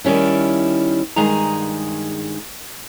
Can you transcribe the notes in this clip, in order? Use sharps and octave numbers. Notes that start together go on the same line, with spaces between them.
D#3 G3 C#4 E4
G2 D#3 G#3 G#4 D#5 A#5